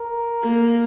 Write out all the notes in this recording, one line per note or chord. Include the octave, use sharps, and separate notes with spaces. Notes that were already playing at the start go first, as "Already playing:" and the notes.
Already playing: A#4
A#3